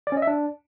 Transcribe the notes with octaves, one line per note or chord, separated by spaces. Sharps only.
D5
C#4
D#5
E5
D4